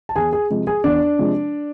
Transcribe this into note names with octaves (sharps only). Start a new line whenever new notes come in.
A5
E2 G#4 G#5
G#4 G#5
C3 F3 G#3
G#4 G#5
E2 D4 D5
C3 F3 G#3